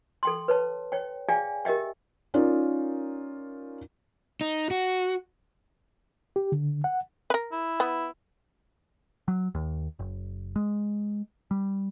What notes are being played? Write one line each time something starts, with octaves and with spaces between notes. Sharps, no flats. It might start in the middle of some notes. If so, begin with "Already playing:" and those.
A4 G5 C6
B4 C#5 A5
C#5 G5
G#4 D5 F5 G5 G#5
G4 A#4 D#5 E5 G5
C#4 D#4 F4 A#4 D5
D#4
F#4
G4
D3
F#5
A#4 B4
E4
B3
F#3
D#2
F#1
G#3
G3